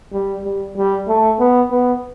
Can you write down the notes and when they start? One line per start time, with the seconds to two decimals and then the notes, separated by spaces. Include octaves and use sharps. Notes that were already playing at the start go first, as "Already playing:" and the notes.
0.13 G3
0.44 G3
0.76 G3
1.08 A3
1.40 B3
1.71 B3